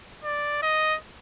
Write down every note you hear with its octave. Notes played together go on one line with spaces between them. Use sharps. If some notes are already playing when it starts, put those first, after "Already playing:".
D5
D#5